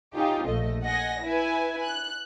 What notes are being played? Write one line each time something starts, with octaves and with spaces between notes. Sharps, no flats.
C#4 D#4 F4 G4
A#1 A3 D#5
D#5 F#5 G#5 A#6
E4 B4 G#5
F#6